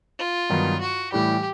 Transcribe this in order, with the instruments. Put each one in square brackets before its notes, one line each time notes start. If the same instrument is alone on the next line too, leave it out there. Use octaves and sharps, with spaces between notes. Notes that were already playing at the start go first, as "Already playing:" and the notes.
[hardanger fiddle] F4
[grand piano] G2 D#3 F#3 B3 D#4
[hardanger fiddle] F#4
[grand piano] A2 E3 G3 [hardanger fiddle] G4